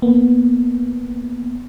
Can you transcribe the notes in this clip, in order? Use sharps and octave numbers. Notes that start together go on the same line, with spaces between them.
A#3 B3